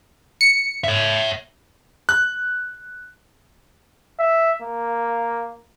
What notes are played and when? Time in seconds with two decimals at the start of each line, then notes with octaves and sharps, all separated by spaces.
0.41 C#7
0.84 C#5 E5
2.09 F#6
4.19 E5
4.62 A#3